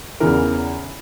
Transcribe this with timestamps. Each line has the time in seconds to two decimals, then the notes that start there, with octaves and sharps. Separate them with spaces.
0.20 E2 C#3 E3 A#4